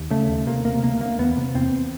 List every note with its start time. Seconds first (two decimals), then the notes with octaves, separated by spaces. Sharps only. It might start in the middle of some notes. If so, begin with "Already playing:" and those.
Already playing: D#2
0.11 C#3 A3
0.29 D#2
0.47 C3 A#3
0.65 C3 A#3
0.83 D2 A#3
1.01 D2 A#3
1.19 E2 B3
1.37 C3
1.55 E2 C4